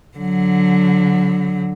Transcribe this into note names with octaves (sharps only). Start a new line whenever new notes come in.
D3 F#3